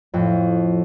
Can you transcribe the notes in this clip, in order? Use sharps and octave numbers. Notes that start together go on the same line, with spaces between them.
F2 A2